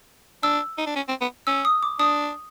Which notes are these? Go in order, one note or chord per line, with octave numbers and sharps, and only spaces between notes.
D4 E6
D#4
D4
C#4
C4
B3
C#4 E6
D#6
D6
D4 D#6